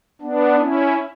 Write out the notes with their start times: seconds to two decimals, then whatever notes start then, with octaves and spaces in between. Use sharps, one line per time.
0.21 B3 D4
0.59 C#4 E4